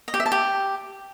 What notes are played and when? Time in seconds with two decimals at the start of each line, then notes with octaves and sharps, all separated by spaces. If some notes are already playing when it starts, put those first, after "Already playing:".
0.08 D#5
0.14 G4
0.20 E5
0.26 A5
0.32 G4